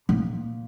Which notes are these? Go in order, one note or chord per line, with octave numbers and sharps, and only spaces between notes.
A#2